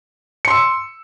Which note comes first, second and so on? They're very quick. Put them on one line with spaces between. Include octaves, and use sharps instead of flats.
C#7 C6 E6